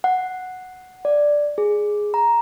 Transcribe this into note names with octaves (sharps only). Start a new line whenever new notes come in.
F#5
D5
G#4
A#5